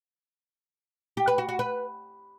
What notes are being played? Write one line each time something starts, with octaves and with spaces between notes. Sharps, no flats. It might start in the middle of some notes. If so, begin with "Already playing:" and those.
G4
B4
F#4
F#4
B4